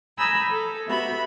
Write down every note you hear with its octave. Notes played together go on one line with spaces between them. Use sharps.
G#5 A#5 B5 D#6 E6 G6
A4
B3 F#4 G4 E5 B5